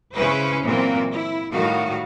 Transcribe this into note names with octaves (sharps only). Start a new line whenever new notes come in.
C#3 C#4 E4 B4 C5
A#2 E3 F#3 A#3 C4 F4
E4
A2 D#3 G3 A3 F#4 F5